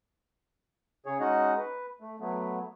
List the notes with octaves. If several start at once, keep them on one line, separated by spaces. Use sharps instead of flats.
C#3 G#4 C#5
G#3 C#4 D#4 F#4 D#5 F#5
B4
A3
F#3 A3 B3